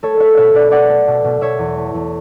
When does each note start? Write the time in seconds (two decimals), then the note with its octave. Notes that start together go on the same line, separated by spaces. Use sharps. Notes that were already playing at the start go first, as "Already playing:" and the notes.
0.03 A3 A4 C#5
0.20 A3 C#5 E5
0.37 B2 C#5 E5
0.53 B2 B4 D5
0.71 A3 D5 F#5
0.89 A3
1.08 B2
1.24 B2
1.41 B2 C#5 E5
1.59 E2
1.76 A3
1.94 E2